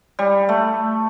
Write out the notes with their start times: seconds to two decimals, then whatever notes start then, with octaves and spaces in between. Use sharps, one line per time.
0.19 G3
0.49 A3